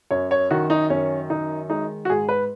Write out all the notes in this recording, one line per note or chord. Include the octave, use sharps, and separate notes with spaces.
F#2 C#5
C#5
D#3 F#4
D#4
F#2 C#4
D#3 D#4
G#3 D#4
F#4
G#2 G#4
B4